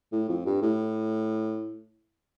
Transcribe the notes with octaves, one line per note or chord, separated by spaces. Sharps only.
A2
F2
G2
A2